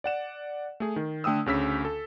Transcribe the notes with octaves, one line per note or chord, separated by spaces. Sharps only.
D5 F#5 E7
A3 G#4
D#3
D3 A3 G5 D#6 E6
D2 C#3 E6 B6
A4